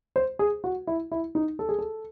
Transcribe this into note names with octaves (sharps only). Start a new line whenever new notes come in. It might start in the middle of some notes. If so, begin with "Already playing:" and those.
C5
G#4
F#4
E4
E4
D#4
A4
G#4
A4